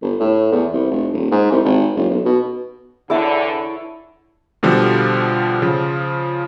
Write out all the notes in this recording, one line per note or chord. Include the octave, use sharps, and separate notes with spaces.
G1
A2
E2
C2
F1
D#1
G#2
C2
G#1
F#1
B1
B2
E2 D3 E4 G#4 C#5 E5 A5
B2 D3 F3 G3
C#3 F3